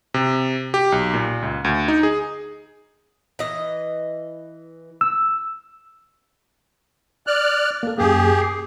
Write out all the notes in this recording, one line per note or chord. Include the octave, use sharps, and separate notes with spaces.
C3
G4
B1
A#2
C#2
D2
D#4
G#4
E3 D#5
E6
D5 F6 F#6
A#3 A4
F#2 A#3 G4 G#4
D6 C7